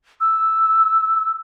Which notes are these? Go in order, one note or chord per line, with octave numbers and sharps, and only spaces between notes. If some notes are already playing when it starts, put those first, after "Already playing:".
E6